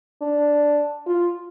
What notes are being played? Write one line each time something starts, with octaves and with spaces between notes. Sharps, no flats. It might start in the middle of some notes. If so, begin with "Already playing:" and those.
D4
F4